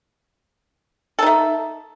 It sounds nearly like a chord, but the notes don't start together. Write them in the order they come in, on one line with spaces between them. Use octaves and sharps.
A4 D#4 A3